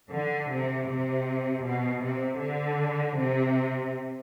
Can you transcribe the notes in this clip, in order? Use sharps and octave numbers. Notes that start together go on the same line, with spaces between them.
D3
C3
C3
B2
C3
D3
C3